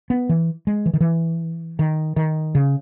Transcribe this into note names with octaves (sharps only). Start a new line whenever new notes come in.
B3
E3
G#3
E3
D#3
E3
D#3
D#3
C#3